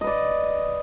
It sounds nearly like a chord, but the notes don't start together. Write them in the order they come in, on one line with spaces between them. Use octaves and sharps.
D#5 B4 D5